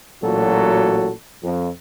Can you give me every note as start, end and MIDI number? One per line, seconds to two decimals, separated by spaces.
0.23 1.11 33
0.23 1.11 46
0.23 1.11 54
0.23 1.11 66
0.23 1.11 69
1.44 1.70 41